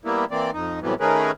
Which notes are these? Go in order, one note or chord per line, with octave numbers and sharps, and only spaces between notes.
G3 A#3 B3 E4
E3 A#3 C4 D5
F2 D#4
A2 C3 E3 F#3 G3 B3
D#3 A3 C#4 G#4 A#4 B4